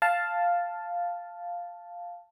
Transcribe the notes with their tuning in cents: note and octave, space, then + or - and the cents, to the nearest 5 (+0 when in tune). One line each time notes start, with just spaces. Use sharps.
F5 +0 A5 +0